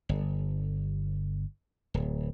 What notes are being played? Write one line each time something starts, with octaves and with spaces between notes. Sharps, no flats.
G1
D1